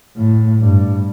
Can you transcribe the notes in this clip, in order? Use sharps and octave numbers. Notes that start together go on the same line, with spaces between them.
A2
G2